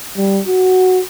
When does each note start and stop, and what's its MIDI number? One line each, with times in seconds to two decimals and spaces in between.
0.17 0.41 55
0.47 1.01 66